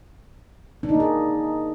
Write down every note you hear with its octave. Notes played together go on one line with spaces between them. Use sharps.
D4
D#4
A#3
G#4